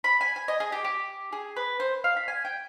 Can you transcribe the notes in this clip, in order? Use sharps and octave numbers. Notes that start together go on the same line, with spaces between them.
B5
G#5
G#5
D#5
G#4
G4
G4
G#4
B4
C5
F5
B5
G#5
G5